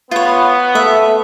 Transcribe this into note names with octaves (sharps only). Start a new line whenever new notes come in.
B3 F4 C#5
A3 E5